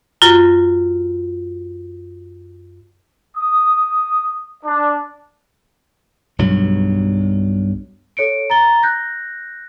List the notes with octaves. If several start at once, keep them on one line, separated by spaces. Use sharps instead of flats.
F#2 F4 F#4 A#6
D#6
D4
B1 G2 F#3
A4 C#5 C#7 D7
A#5 A6 G7
F#6 G6 A#6